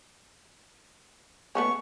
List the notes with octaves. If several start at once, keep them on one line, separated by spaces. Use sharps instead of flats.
A3 B3 C#4 C#6